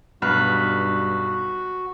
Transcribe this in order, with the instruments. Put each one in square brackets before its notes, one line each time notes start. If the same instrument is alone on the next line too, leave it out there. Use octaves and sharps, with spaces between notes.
[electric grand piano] B1 F6 [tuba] G2 [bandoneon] F#4 [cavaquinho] B4